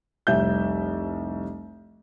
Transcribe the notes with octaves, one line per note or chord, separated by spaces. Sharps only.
F1 C2 E5 G6